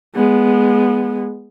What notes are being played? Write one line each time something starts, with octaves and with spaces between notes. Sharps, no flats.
G#3 B3